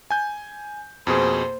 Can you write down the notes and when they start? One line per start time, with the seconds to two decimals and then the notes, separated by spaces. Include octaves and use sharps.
0.10 G#5 G6
1.07 F2 B2 A#3 G#4 C5